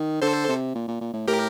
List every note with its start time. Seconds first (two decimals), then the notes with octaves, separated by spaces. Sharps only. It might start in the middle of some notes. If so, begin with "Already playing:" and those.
Already playing: D#3
0.22 D3 A4 C5
0.49 C3
0.75 A#2
0.88 A#2
1.01 A#2
1.14 A2
1.28 A2 G4 A#4